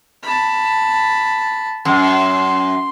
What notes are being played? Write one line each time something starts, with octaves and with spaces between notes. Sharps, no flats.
A5 B5
F#2 C6